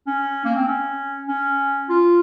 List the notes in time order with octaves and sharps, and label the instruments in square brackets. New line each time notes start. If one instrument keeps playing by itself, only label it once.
[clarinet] C#4
A#3
C4
C#4
C#4
F4